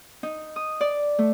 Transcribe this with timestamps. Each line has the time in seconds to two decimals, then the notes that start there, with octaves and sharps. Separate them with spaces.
0.23 D#4
0.56 D#6
0.81 D5
1.19 A3